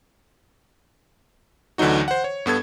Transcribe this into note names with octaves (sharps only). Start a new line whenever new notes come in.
D2 D3 E3 F#3 D#4 F#4
C5 F#5
C#5
G2 B3 A4 G#6